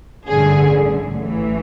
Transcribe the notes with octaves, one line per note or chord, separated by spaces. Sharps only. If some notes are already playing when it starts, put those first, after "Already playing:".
A1 G2 D3 G#4
A1 A2 E3